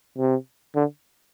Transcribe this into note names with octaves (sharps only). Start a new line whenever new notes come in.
C3
D3